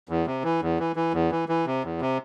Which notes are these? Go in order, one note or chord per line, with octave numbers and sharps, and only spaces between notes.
E2
C3
E3
E2
E3
E3
E2
E3
E3
C3
E2
C3